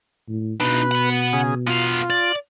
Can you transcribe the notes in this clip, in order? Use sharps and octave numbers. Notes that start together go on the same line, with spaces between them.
A2
B2 D4 D#4 B4
F#5 B5
C#3 G#4
B3 F4 F5
D5